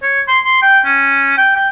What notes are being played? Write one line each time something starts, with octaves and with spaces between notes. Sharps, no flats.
C#5
C6
C6
G5
C#4
G5
G5